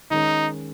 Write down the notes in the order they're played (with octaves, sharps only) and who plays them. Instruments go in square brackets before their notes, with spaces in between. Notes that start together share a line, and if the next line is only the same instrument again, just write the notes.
[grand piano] D#3 G#3 C#4 A#4 C#5 [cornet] D#4